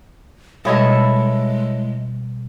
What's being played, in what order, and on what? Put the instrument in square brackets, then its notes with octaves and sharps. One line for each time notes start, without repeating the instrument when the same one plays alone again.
[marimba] B2 G3 [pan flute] G#3 [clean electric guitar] E4 [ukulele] A4 C#5 D#5